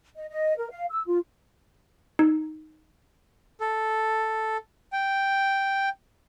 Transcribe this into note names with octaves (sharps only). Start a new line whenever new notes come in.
D#5
D#5
A#4
F5
E6
F4
D#4
A4
G5